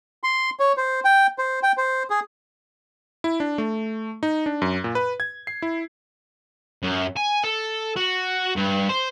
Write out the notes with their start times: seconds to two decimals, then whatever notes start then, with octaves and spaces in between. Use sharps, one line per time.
0.23 C6
0.60 C#5
0.77 C5
1.05 G5
1.38 C5
1.63 G5
1.77 C5
2.10 G#4
3.24 E4
3.40 D4
3.58 A3
4.23 D#4
4.46 D4
4.62 F#2
4.84 A#2
4.95 B4
5.20 G#6
5.47 C7
5.62 E4
6.83 F#2
7.16 G#5
7.44 A4
7.97 F#4
8.56 G2
8.89 C5